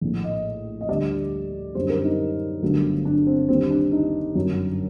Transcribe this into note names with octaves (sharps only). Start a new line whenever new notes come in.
A#1 A2 A3
D#5
D#5
D2 D3 G3 D5
F#2 D3 G3 C5
A#4
D#4
G1 G2 D3 F#3 A3
D4
C4
D#2 D3 G3 C4
D4
D#4
G1 F#2 F#3